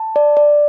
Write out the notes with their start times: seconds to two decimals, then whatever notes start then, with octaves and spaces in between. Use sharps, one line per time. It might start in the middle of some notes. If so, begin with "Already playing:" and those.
Already playing: A5
0.16 D5
0.37 D5